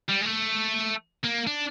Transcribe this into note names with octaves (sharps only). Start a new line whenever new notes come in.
G3
G#3
A3
A#3
D4